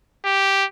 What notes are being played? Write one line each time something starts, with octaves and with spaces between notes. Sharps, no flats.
G4